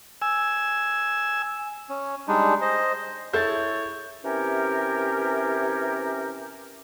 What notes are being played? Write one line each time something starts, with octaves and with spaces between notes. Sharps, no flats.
G#5 E6
C#4
G3 G#3 D4 D#4
C5 D#5
E4 G#4 A4 C#5 G6 A6
C3 E3 C#4 G4 A#4